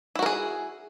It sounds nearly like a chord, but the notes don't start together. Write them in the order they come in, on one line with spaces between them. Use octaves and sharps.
E4 F#4 A#4 G#4